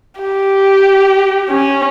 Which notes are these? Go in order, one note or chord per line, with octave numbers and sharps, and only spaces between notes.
G4
C#4